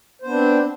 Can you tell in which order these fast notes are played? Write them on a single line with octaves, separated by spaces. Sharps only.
C5 B3 D4 C4